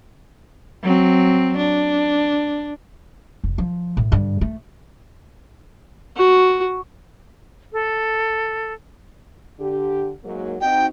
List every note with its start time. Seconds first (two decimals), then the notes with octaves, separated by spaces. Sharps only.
0.83 F#3 C4
1.57 D4
3.44 F1
3.58 F3
3.97 A2
4.12 G2 D3
4.41 A3
6.17 F#4
7.73 A4
9.60 D3 G4
10.24 G#2 F#3 A#3
10.61 C4 D#4 F#4 G5